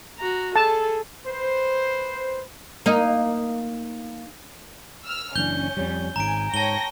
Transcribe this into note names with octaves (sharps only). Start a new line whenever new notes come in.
F#4 A#5
G#4 A4 A5
B4 C5
A#3 D#4
E6 F6
F#1 E3 C#4 D4 G6 G7
F2 G3
G#1 G#2 G#5 A#5 D7
G#2 C#5 G5 A5 A#6 G7